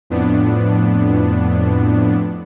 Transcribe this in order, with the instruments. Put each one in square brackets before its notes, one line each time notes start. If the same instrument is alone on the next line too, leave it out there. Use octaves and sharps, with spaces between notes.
[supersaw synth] F2 A2 B3 D4